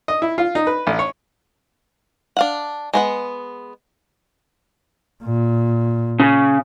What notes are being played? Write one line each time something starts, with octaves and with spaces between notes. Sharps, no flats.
D#5
E4
F4
D#4
B4
A1
C#5
D4 F5 F#5
G#3 B3 F#5
A#2
C#3